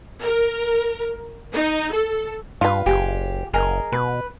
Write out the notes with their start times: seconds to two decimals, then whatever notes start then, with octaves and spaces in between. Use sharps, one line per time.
0.21 A#4
1.53 D#4
1.92 A4
2.61 G2 F4 B4
2.86 F#1 G4 G#4
3.53 F#1 G#4 A#4 D#5
3.92 B2 B4